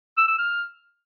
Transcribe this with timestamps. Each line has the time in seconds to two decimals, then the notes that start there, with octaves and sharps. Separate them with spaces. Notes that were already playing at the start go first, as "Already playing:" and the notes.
0.18 E6
0.28 E6
0.38 F6